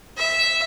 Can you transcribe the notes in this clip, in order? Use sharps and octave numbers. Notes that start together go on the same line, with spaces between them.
E5